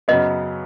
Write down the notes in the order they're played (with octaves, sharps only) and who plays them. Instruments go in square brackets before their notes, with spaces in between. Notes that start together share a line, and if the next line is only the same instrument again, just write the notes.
[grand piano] F#2 C#3 F#3 B3 [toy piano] D#5